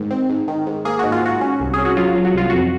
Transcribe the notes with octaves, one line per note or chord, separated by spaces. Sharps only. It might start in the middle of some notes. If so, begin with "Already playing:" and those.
Already playing: G#2 D#3
C4
G#2
D#3
G#2
A#3 G#4
G#2 F#4
F4
G#2 F#4
C#4
C2
C#4 G#4
F#4
F#3 F4
F#3
F#4
C2 F4
F2 F#4